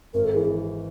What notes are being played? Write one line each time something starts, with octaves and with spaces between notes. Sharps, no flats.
G#1 A#4
A4
E3 G#4